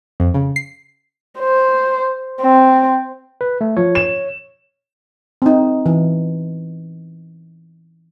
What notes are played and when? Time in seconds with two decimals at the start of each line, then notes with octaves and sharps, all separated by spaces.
0.20 F2
0.34 C#3
0.56 C7
1.40 C5
2.42 C4
3.41 B4
3.61 A3
3.77 F3 C#5
3.95 E7
5.42 C4 D#4
5.86 E3